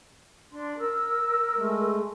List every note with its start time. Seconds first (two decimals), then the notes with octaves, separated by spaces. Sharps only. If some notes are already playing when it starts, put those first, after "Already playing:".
0.50 D4 C6
0.77 A#4 E6
1.57 G#3 A3